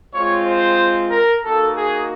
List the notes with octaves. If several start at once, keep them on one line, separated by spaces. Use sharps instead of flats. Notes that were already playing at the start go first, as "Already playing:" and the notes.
G#3 C4 F4 C#5
C5
A#4
A#3 D#4 F#4 A4
G#4